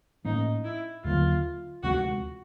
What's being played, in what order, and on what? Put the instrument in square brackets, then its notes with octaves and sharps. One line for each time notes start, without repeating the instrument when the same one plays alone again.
[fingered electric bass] A2 F3 A#3 C#4 [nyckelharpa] D#4
[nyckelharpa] E4
[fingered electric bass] D#2 D3 F#3 A#3 [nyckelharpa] F4
[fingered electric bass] D2 C3 F3 G#3 [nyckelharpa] F#4